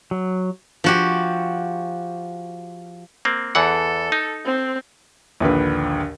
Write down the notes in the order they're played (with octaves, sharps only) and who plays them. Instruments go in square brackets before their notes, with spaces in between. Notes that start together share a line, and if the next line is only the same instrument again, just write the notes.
[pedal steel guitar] F#3
[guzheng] F3 F#4 G4
[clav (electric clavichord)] A#3 C4
[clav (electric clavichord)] E2 E3 F#5 [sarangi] A4
[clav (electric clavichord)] D#4
[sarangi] C4
[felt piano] A#1 D#2 D3 B4